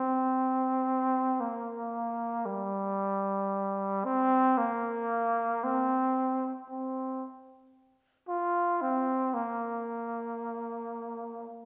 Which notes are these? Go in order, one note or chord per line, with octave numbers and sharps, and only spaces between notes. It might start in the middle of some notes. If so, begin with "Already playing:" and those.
Already playing: C4
A#3
G3
C4
A#3
C4
C4
F4
C4
A#3